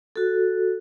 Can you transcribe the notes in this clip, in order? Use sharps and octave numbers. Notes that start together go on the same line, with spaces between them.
F#4 A4